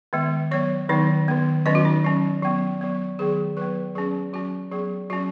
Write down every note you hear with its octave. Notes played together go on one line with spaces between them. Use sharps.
D#3 G#3 B3
F#3 B3 C#5
D#3 F#3 B3 D#4
D#3 B3
D#3 F#3 C#4 D#5
F#4
D#4
F#3 C#4
F#3 B3
F#3 B3
D#3 F#3 B3 G#4
F#3 B3 B4
F#3 C#4 G#4
F#3 C#4 F#4
F#3 B3 G#4
F#3 C#4 F#4